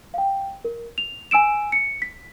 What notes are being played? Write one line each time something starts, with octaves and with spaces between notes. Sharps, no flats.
F5 G5
A#4
F7
G#5 E6 D7 E7
C#7
B6